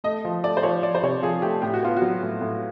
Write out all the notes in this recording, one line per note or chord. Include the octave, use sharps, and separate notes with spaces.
A3 D#5
F3
A3 D5
C5
F3 C#5
F3 D5
C5
C3 C#5
F3 G#4
A3 G4
A2 G4
F#4
B3 F4
F#3 F#4
A2
A2